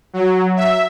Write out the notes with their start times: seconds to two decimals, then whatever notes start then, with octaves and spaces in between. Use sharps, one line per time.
0.13 F#3
0.56 E5